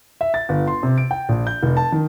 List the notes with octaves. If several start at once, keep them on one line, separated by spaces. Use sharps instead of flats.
E5
A6
G1
C6
C3
D7
G5
A#1
G6
F1
A5
D#3